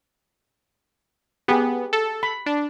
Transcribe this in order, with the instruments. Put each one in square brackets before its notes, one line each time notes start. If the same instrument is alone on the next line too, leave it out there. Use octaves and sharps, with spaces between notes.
[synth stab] B3 [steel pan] G4 G#4
[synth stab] A4
[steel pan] B5
[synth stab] D4